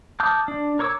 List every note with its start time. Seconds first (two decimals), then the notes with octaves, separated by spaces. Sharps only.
0.20 A5 D6 D#6 F6 G6
0.48 D4
0.79 A#4 C#5 D6 E6